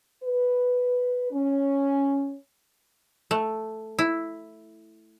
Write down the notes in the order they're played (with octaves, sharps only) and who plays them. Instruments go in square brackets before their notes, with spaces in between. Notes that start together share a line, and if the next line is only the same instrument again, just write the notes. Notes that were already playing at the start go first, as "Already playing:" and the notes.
[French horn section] B4
C#4
[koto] A3
E4